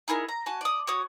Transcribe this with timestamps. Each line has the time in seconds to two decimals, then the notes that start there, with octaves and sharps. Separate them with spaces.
0.08 D#4 E4 G#4 A#4
0.29 A#5
0.46 F#4 G#5 A5
0.61 D5 D#6
0.87 F#4 C#5 D#6